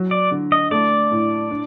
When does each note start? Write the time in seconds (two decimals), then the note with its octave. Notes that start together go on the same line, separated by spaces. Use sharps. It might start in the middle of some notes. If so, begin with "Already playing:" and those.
Already playing: F#3
0.11 D5
0.31 D3
0.52 D#5
0.71 A3 D5
1.11 A2
1.51 D4